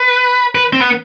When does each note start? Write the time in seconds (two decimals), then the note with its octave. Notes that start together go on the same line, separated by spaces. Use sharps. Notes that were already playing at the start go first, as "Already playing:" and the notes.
Already playing: B4
0.55 B4
0.73 C4
0.81 B3